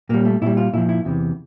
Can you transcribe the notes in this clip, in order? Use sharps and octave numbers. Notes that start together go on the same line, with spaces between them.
A#2 G3 A#3
A3
A#2 G3 E4
F4
A#2 F3 E4
E4
E2 C3 E3